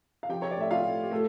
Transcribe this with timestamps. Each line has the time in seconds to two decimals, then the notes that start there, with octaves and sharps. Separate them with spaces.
0.23 F5
0.29 F3 G4 G5
0.42 C#5
0.51 D5
0.57 A2 E5
0.71 F4 F5
0.85 A2
1.03 G4
1.11 A3 A4